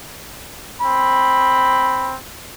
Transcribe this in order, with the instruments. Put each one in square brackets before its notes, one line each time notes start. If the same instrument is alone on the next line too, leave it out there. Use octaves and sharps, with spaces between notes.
[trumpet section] C4 B5